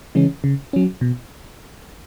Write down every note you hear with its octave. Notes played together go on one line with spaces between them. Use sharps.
C#3 E3 G#3 C#4
C#3
F#3 C#4
B2